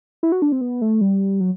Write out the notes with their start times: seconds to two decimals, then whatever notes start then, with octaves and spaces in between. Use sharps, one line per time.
0.23 E4
0.32 F#4
0.42 D4
0.52 C4
0.61 B3
0.82 A3
1.01 G3
1.40 F#3